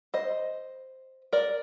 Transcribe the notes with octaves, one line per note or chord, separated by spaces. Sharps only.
C5 D#5
A#4 D5